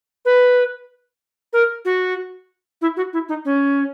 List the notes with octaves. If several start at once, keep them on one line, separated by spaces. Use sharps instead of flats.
B4
A#4
F#4
E4
F#4
E4
D#4
C#4